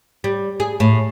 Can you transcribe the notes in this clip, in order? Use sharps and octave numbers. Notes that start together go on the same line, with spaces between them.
G3
G#4
A2